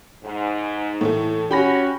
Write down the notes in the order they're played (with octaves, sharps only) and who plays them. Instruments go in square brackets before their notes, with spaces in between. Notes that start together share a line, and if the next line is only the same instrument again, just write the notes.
[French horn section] G#2
[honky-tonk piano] A2 E3 A3
[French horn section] C#4 F#4 [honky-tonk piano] G4 B5 A#6